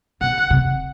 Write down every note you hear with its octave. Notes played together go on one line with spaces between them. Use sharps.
B2 F#5
C3